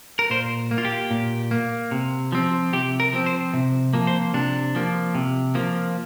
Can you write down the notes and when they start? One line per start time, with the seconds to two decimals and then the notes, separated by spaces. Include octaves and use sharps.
0.19 A#4
0.30 A#2 C5
0.71 A#3
0.78 F4
0.85 G4
1.11 A#2
1.51 A#3
1.91 C3
2.32 F3 C4
2.73 C3 G4
3.00 A#4
3.13 F3 C4
3.26 C5
3.54 C3
3.93 F3 A#3
4.07 C5
4.34 C3 D4
4.75 F3 A#3
5.15 C3
5.55 F3 A#3